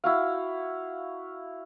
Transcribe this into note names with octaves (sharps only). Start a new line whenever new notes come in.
E4 F#4 F5